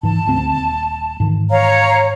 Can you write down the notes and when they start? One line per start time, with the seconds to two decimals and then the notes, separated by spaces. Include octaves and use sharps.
0.03 G#2 E3 A5
0.27 D2 C4
0.50 D#1
1.20 G#2 D#3 E3
1.49 C#5 F5 A#5